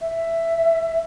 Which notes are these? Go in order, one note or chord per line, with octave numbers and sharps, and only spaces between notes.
E5